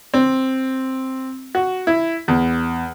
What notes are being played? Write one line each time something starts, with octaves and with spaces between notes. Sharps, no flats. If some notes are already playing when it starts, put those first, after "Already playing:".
C4
F#4
E4
E2